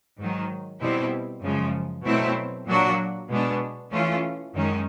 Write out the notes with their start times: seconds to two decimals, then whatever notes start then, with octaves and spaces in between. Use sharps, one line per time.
0.19 G#2 D#3 F#3
0.81 B2 G3 C4 E4
1.43 F#2 C#3 F3 G#3
2.05 B2 F#3 A3 C4 E4
2.67 A#2 F#3 A#3 D4 F#4
3.30 B2 G#3 B3 D4
3.92 E3 A3 C#4 F4
4.54 F#2 D#3 G#3 C#4